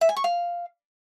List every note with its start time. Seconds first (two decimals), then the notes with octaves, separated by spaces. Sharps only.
0.01 E5
0.09 G#5
0.16 C#6
0.24 F5